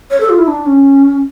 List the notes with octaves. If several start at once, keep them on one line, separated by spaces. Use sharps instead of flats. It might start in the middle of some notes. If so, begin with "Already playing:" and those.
C#5
A4
F4
E4
D4
C#4